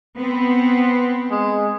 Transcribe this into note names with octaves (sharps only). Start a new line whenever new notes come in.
B3 C4
G#3